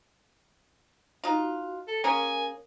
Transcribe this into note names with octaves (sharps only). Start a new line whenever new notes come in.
D#4 F4 F#4
A4
A#3 C#4 G#4 A#4 G#5